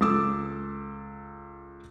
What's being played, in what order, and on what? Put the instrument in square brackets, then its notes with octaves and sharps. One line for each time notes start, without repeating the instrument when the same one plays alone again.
[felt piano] C#2 A4 D6 E6